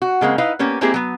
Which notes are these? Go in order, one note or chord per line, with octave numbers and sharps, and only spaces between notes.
F#4
C#3 G#3 A#3 C4
D#4 E4 B4 D#5 F5
A#3 B3 C#4 G4
G#3 A#3 C4 E4 G4 G#4
F#3 B3